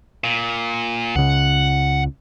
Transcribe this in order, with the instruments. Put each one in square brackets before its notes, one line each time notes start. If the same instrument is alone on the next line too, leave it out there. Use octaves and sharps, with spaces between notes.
[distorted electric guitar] A#2
[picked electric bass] C#2 C#3 [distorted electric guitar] F#5